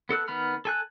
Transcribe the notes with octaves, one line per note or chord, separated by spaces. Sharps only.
B3 A4 E6 F#6
D#3 B3 B5 F6
A4 G#5 F#6